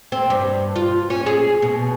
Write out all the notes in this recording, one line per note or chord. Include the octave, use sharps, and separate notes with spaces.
C4
G2
F4
C#4
G#4
B2